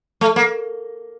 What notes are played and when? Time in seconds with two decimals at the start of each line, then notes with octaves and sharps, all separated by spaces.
0.21 A3
0.36 A#3